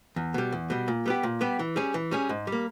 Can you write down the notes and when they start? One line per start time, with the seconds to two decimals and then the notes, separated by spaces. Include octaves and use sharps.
0.16 E2
0.34 B2 G3
0.53 E2
0.70 B2 G3
0.88 A#2
1.06 G3 B3 G4
1.23 A#2
1.41 G3 B3 G4
1.59 E3
1.76 G3 C#4 G#4
1.94 E3
2.11 G3 C#4 G#4
2.29 G#2
2.47 G3
2.52 A#3